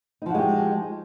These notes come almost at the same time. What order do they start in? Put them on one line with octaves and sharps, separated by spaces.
D#4 F3 F#4 G#3 G4